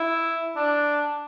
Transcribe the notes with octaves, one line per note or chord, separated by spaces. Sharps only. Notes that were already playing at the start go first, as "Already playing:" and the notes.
Already playing: E4
D4